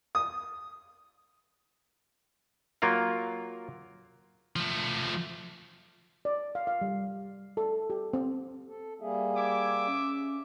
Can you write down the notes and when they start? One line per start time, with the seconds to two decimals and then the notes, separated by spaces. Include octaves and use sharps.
0.15 D#6
2.82 F#3 A#3 F4 A#4 F5
4.56 F3 A3
6.25 D5
6.55 F5
6.67 F5
6.81 G3
7.57 A4
7.90 G4
8.13 C4
8.68 A4
9.00 G3 A#3 G#4 E5
9.36 E5 D6 G#6
9.87 C#4